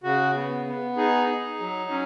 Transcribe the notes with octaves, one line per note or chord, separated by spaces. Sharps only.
C#3 F#4
B3
B3
D#4 G#4
D#4
F#3
C#4